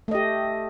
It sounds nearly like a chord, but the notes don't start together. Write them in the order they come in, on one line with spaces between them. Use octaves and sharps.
A3 D#5 G4